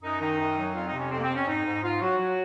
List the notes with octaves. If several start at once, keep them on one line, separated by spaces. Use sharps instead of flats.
F#2 D#4
D#3 D#4
F#2
F#3
F2 F4
D#4
C3
C#4
F2 C4
A#3
C4
F2
C#4
G#2 D#4
G#2
G#2 F4
F#3 F#4
F#3